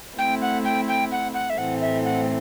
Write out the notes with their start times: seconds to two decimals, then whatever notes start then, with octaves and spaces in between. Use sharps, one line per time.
0.18 A3 C4 E4 G5
0.41 F#5
0.64 G5
0.88 G5
1.11 F#5
1.34 F#5
1.49 E5
1.57 A2 E3 A3 C4 F#5
1.81 E5
2.04 F#5